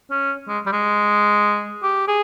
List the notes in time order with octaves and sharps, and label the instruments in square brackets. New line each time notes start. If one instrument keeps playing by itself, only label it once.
[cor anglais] C#4
G#3
G3
G#3
G4
G#4